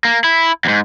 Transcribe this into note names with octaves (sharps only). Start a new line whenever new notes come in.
A#3
E4
E2 G#2